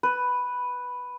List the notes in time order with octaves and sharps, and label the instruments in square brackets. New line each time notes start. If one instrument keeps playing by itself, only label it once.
[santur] B4